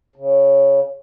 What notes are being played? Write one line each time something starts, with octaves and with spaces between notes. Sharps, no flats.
C#3